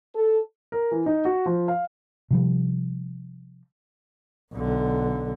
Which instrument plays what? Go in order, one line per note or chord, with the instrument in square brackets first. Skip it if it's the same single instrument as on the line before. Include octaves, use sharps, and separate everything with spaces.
[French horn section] A4
[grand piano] A#4
E3
D#4
F#4
F3
F5
[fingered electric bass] C3 F3 G3
[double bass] B1 D3